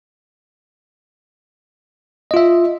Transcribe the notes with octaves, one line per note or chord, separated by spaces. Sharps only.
F4 D#5 E5